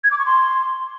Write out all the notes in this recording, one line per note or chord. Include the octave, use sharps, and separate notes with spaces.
G#6
D6
C#6
C6